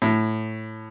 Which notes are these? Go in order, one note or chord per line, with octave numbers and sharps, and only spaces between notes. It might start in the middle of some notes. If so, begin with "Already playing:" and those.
A2